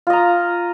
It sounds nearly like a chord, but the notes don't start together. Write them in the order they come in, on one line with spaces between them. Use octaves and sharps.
F4 D#5 A#5